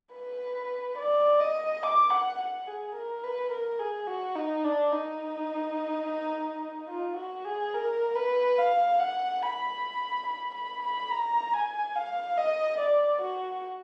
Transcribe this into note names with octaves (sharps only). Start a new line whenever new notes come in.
B4
D5
D#5
D6
F#5
F#5
G#4
A#4
B4
A#4
G#4
F#4
D#4
D4
D#4
F4
F#4
G#4
A#4
B4
F5
F#5
B5
B5
B5
B5
A#5
G#5
F5
D#5
D5
F#4